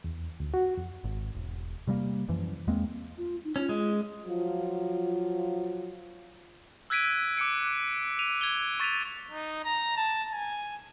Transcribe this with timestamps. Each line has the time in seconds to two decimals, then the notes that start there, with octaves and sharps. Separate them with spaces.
0.04 E2
0.40 D2
0.54 F#4
0.77 F2
1.04 G#1
1.35 E1
1.87 C3 G3 G#3 A#3
2.28 F#2 E3 F3
2.67 E2 G#3 A#3 C4
3.18 F4
3.44 D#4
3.56 C#4 F4
3.69 G#3
4.27 F3 F#3 F4
6.90 E6 F#6 G#6 B6 D7 D#7
7.37 D6 F#6 C#7 D7
8.19 D#7 F7
8.41 G#6 F7 G7
8.80 C#6 A6 B6 D#7 F7
9.31 D#4
9.64 A#5
9.97 A5
10.32 G#5